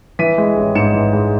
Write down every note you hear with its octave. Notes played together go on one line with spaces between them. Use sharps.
E3 B6 D#7
G#3
A1
G#2 C#7 E7
E3
G#3